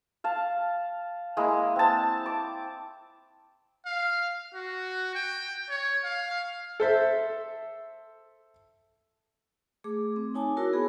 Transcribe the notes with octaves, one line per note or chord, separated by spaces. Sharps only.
F5 A5
G#3 A#3 E4
C4 A5
D6
F5
F#4
G5
C#5
F5
A4 C5 E5
A3 G#4 D6
C4
D#4 C#5 G#5 A5 D6
E4 F#4 A#4 C#5
B3 G#4 B5